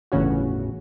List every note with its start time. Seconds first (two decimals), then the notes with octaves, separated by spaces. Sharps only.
0.12 G1 E2 A2 C#3 C#4 F#4